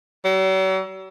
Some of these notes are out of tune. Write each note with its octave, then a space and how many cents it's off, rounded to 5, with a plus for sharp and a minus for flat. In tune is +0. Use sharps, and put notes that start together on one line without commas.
F#3 +45